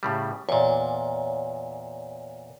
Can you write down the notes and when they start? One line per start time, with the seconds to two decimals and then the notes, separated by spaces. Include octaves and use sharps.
0.03 A2 C#3 G3
0.49 E2 A#2 C#5 D5